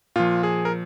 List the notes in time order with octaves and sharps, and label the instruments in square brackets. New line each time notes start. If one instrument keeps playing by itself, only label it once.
[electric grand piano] A#2 F3 F4
G#4
A#4